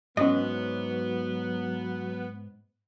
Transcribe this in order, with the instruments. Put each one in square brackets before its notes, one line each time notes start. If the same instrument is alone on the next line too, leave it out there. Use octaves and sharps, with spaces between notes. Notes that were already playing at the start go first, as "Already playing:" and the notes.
[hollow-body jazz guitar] G#2 [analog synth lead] F#3 [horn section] B3 [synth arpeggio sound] C#4 D#5